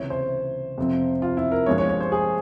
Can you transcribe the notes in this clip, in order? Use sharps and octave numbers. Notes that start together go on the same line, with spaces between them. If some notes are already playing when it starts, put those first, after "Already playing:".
Already playing: C#2 C3 E3 C#5
C5
F2 C3 F3 C4
F4
E4
A#4
G2 F3 G#3 C#5
C#5
C#5
C5
G#4